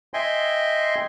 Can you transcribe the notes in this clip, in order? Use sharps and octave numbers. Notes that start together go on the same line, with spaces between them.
D#5 E5 G5 G#5 C6